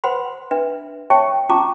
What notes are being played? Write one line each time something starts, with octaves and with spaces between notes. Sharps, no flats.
B4 C5 F#5 B5 C6
D4 B4 E5
C#5 E5 G5 A5 C#6
C#4 F4 A5 A#5 C#6 D6